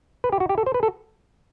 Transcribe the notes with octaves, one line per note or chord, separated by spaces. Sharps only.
B4
G4
F#4
G4
A4
C5
B4
A4